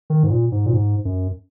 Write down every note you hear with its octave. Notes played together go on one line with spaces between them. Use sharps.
D#3
G#2
A#2
G#2
A#2
G#2
F#2